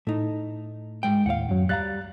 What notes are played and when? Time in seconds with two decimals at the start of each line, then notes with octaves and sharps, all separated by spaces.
0.07 A2 A3 D#4
1.03 G#2 G#3 G5
1.26 D#2 A2 F5 F#5
1.49 F#2 F#3
1.69 G3 F5 A#5 F#6 A6